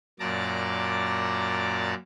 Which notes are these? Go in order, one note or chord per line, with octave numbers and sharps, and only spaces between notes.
F#2 A#2 D5 A5 A#5 D6